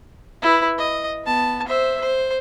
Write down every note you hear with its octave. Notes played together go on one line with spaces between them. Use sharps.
E4 B4
D#5
B3 A5
C5 E5
C5